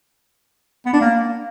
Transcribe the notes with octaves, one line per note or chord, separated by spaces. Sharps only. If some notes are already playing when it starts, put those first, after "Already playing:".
B3
D4
A#3